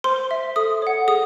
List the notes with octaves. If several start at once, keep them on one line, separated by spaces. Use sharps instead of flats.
C5 C6
E5
A4 D#6
C#5 F#5
G#4 D#6